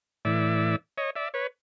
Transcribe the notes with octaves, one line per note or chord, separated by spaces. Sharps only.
A2 E3 D5 E5
C#5 D#5
D5 E5
B4 C#5